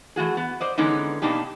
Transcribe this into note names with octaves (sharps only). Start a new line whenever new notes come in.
E3 A3 F#4 G#4
B3
C5 D5 D#5
D3 E3 G#3 B3 C#4 D#4
B2 A#3 D4 D#4 G4